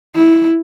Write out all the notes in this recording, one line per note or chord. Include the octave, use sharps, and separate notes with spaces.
E4